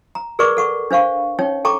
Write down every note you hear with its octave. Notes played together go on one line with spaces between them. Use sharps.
A#5
G#4 A#4 B4 D5 C#6 D6
A4 F#5 C#6
D4 C5 F5 C#6
C#4 D#4 C#5 G5
A4 G5 A5 A#5 C#6 D6